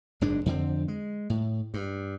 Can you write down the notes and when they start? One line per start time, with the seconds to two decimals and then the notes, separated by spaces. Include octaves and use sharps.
0.21 F#1 G#2 G#3 D4
0.46 F2 D3 C4
0.88 G#3
1.30 A2
1.74 G2